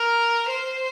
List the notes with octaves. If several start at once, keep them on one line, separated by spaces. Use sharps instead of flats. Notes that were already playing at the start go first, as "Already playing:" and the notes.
Already playing: A#4
C5